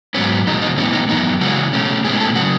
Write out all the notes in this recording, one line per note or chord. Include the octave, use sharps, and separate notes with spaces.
G#2 F#3 B3 C#4
E2 B2 G#3 D#4
D#4
A2 E3 G#3 B3 C#4
D#4
F#2 E3 B3 D#4
C#3 E3 G#3 C#4 F#4
B2 A3 C#4
A2 G#3 B3 G#4
A4
C#3 F#3 F#4